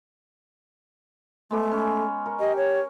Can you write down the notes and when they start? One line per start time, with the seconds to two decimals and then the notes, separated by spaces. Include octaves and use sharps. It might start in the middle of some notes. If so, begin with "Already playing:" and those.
1.51 G#3 A3 B3 D6
1.72 C#4
2.26 A#4 C#6
2.40 G4 D#5
2.57 C#5